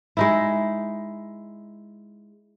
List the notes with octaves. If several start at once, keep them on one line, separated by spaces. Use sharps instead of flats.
G#3 D#4 E4